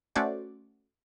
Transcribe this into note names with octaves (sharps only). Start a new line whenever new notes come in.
A3 C#4 F#4 C5 D5